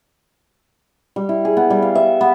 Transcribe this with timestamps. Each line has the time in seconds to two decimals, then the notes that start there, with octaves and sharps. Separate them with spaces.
1.16 G3
1.29 E4
1.45 G#4
1.57 B3
1.70 G3
1.82 F5
1.95 E5
2.21 B3